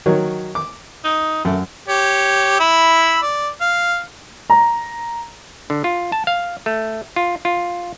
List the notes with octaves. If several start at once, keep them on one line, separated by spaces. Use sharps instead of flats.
D#3 F#3 C#5
D6
D#4
F#2 A3
G4 C#5
E4 B5 E6
D5
F5
A#5
D3
F4
A5
F5
A3
F4
F4